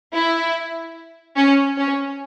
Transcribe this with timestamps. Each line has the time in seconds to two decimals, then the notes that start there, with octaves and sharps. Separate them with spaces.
0.13 E4
1.36 C#4
1.77 C#4